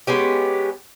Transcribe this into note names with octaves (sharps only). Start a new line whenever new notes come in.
G#3 B3 C#4 G4